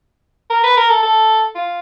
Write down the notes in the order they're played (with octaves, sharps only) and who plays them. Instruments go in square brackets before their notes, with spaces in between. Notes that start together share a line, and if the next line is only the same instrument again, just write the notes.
[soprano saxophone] A#4
B4
A#4
A4
A4
F4